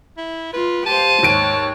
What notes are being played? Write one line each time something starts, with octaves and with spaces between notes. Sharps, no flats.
E4
F4 B4
G4 C5 F5 A5 D#7
D#2 G#2 C#5 D7